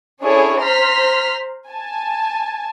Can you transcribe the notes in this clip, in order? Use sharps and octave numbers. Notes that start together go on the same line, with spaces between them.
C#4 D4 E4 G#4 A4 C#5
C5 A#5 C6 F6 B6
G#5 A5